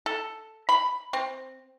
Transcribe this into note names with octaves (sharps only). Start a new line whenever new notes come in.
A4
B5
C4